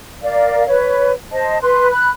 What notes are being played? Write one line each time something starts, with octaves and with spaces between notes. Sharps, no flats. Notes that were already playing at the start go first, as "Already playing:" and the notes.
A#4 D5 F5
B4 C#5
C5 D#5 A5
B4 C6 F#6
B5 F#6